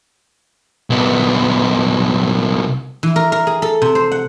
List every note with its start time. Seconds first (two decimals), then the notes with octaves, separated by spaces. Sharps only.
0.90 C2 B3
3.03 E3
3.16 A#4
3.32 A#4
3.47 G#4
3.62 A4
3.82 C3
3.95 C5
4.12 F#5